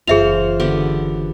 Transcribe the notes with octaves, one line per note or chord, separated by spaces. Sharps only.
F#1 E3 F4 G#4 C5 E5 F7
D3 B3 G4